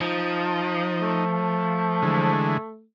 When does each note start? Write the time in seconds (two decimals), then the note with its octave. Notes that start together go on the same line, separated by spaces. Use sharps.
0.01 F3 D#4
1.02 A3
2.03 D3 E3 G#3